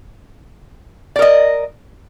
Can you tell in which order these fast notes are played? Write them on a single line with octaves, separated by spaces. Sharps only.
D5 A#4 D#5